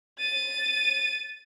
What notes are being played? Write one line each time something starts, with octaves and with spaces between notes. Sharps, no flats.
A6 D#7